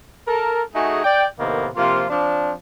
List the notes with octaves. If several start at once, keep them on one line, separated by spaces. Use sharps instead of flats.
A4 A#4
A3 D#4 F#4 G#4
D5 G5
A2 C3 D#3 A#3 B3
C3 F3 A#3 F4
F3 C4 D4